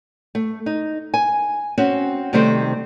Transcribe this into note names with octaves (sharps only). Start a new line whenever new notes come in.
A3
D#4
G#5
C4 C#4 F#4
C3 D#3 G3 A3 C4 C5